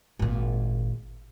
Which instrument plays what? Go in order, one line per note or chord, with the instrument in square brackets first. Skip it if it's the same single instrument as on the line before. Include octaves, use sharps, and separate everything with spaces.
[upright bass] G#1 A#2